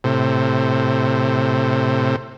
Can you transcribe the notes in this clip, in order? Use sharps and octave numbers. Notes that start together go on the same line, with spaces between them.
A2 C3